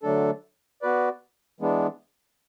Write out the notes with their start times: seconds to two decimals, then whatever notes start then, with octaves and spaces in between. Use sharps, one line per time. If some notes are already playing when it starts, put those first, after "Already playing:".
0.03 D3 F#3 A3 D4 A4
0.82 B3 F#4 B4 D5
1.60 E3 G#3 B3 D4